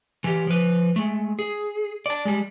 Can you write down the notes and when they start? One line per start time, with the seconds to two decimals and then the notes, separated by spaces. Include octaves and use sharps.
0.24 E3 G4
0.47 F3 B4
0.96 G#3 A3
1.39 G#4
2.06 D5 A5
2.25 G3 G#3